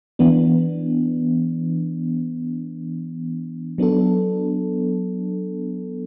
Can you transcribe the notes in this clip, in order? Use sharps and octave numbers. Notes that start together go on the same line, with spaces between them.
E3 B3 D4
F#3 B3 D4 A4